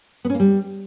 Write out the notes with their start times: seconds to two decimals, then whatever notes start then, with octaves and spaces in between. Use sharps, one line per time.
0.25 B3
0.30 C#4
0.35 A#3
0.40 G3